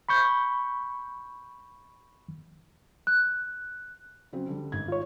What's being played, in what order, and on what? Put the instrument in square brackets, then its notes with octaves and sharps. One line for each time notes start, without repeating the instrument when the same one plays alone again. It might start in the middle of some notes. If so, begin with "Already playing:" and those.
[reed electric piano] B5 C#6 G6
[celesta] F#6
[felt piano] C#3 F#3 C4
D3 G3
G#1 G#6
[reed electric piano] F4 C#5